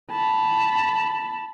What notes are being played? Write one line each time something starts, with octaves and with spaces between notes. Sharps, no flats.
A5 B5